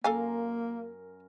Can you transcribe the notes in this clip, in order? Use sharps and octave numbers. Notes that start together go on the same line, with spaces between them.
F#2 A#3 A4 A#4 F5 G#5 C6